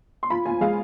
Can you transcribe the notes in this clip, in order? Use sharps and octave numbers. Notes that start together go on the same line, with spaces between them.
C6
F4 B5
F4 G#5
G#3 F5